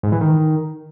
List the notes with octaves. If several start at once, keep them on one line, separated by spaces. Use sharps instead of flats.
G#2
E3
D#3